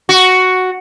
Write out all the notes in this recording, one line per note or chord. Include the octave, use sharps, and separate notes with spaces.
F#4